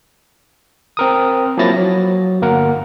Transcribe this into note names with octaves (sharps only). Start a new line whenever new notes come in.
C4 A#4 D#6
F3 F#3 A#3 E4 A6 A#6
F#3
G1 A#3 A#4 F#5